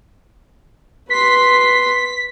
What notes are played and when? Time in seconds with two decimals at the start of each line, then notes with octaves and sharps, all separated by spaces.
1.10 B4 C6 B6